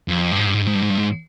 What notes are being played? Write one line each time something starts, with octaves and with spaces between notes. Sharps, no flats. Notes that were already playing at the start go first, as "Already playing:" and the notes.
F2
G2
G#2
G2
G#2
G2
G#2
G2
G#2
G2
G#2